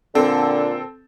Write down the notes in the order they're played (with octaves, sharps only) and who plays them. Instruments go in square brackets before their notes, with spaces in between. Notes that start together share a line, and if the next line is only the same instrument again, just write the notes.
[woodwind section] A#2 D3 [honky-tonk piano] C4 A4